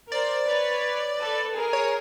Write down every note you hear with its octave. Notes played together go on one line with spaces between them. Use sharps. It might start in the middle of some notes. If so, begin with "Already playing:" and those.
A#4 C5 D5
B4 C#5
A4 B4
G#4 A#4
C#5